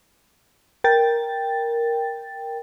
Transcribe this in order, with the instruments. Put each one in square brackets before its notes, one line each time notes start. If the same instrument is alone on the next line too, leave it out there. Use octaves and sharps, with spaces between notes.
[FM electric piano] A#4 G5 A6